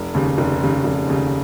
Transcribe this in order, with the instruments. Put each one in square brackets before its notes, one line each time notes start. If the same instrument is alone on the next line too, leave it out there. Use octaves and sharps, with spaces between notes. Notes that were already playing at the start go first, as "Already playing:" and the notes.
Already playing: [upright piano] F1
D#2 C#3
F1
D#2 C#3
F1
D#2 C#3